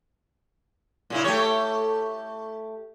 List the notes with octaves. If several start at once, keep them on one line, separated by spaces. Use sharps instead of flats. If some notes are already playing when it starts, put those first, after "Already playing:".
A#2 C#3 E4
A3 G4 C#5